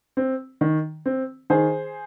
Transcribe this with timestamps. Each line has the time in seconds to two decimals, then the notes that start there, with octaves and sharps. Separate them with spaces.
0.17 C4
0.61 D#3
1.06 C4
1.50 D#3 G#4 C5